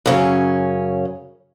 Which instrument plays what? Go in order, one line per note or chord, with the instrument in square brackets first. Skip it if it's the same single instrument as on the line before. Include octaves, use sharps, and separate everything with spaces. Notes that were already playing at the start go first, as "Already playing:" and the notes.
[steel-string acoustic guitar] F#2 C#3 C#4